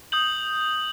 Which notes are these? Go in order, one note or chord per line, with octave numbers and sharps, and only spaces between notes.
D#6 G6 F#7